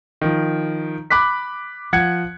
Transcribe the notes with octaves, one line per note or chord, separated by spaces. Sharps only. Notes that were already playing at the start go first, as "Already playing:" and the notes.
D#3 F3
B5 D6 F#6 B6
F3 F#5 F#6 G#6 C#7